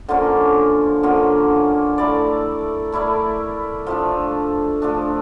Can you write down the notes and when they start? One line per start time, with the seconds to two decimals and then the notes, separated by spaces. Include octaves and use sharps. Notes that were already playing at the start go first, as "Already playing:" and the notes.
0.09 D3 F3 A#3 C#4
1.03 D3 F3 A#3 C#4
1.98 A3 E4 A#4 D5
2.92 A3 E4 A#4 D5
3.86 F3 A3 D4
4.82 F3 A3 D4